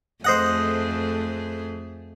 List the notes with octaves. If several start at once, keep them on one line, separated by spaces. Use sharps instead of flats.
F2 A3 G#4 C5 D#5 F#5